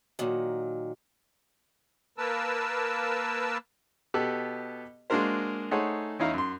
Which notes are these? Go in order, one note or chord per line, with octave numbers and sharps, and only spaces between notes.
A#2 D#3 F#3
A#3 A#4 B4 A5 E6
B2 B3 G4 A4 F#6
G#3 A#3 D4 F#4 A#4 C5
A3 D#4 G#4 C5 C#5 F#5
E2 C#4 D#4 E4 F5 A#5
F#2 C6